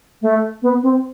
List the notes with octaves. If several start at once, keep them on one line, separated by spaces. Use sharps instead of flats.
A3
B3
C4